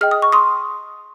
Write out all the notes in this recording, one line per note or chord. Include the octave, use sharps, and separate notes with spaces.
G#4 D#5 G5 F6
D#6
C#6
C6 D#6